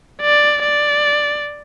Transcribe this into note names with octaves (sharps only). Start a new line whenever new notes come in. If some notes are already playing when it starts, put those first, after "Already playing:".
D5
D5